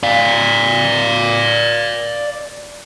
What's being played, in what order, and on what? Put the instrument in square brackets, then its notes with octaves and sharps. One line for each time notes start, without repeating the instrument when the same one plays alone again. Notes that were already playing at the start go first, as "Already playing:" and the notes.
[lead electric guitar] D5 F5